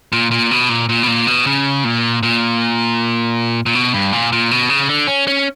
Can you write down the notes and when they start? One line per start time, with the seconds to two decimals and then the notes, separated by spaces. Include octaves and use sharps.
0.12 A#2
0.31 A#2
0.51 B2
0.69 A#2
0.89 A#2
1.03 B2
1.07 A#2
1.27 B2
1.47 C#3
1.84 A#2
2.23 A#2
3.66 A#2
3.75 B2
3.94 G2
4.13 A#2
4.32 A#2
4.51 B2
4.69 C#3
4.89 D3
5.07 C#4
5.28 C#4